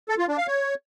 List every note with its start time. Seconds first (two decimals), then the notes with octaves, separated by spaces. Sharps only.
0.09 A4
0.18 F4
0.28 D4
0.38 F5
0.47 C#5